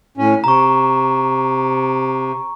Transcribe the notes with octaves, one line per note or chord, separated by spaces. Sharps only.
A2 C#4
C3 A#5 C#6